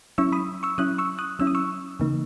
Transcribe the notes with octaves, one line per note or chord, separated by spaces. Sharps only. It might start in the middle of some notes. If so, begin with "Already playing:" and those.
F#3 C#4 E4 C#6 E6
B5 D#6
C#6 E6
F#3 C#4 E4 D#6 F#6
C#6 E6
D#6 F#6
F#3 C#4 E4 E6
D#6
C#6 E6
C#3 E3 A#3 D#4